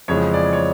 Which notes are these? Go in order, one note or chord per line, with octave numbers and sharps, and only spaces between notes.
F2 C#3 E3 G#3 C#5
D5
C#5